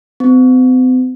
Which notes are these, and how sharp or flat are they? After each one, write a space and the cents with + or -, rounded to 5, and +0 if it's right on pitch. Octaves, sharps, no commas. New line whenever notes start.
C4 -45